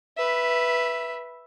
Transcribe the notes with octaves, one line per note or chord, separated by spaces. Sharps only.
B4 E5